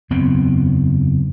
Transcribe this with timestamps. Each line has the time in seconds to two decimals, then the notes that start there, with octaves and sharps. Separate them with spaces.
0.10 F#1 E2 B3 C4